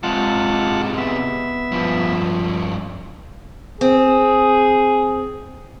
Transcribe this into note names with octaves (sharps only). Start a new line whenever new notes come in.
C3 G#3 F4 F#5 A5
B3 E5
G2 F3
C4 G#4